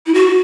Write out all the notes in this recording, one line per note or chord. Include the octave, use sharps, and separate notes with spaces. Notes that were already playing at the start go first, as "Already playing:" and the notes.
E4
F#4